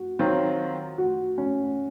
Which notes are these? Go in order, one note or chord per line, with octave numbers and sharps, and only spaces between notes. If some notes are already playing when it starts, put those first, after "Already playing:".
Already playing: F#4
D#3 F#3 C4 F4
F#4
C#4